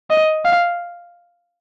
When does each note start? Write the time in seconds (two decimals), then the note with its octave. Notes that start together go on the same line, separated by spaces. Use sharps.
0.10 D#5
0.45 F5